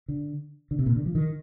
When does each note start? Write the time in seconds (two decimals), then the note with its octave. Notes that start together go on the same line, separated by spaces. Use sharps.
0.08 D3
0.71 D3
0.79 C3
0.86 A#2
0.95 D3
1.06 F3
1.15 D#3